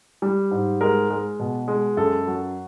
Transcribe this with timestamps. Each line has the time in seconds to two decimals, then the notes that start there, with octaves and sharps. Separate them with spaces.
0.22 G3
0.51 G#2
0.81 G#3 A#4
1.10 G#3
1.40 B2
1.68 G#3
1.97 F#2 A4
2.27 F#3